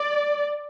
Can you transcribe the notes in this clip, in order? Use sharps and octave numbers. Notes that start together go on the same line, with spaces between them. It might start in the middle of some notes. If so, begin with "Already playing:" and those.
Already playing: D5